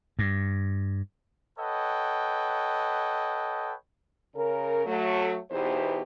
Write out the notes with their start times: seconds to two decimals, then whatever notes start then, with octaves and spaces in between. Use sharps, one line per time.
0.19 G2
1.58 A4 B4 C#5 D#5 F#5 G5
4.34 C#3 A#4
4.85 F#3 A3
5.51 E2 B2 E3 D#4 G4 C5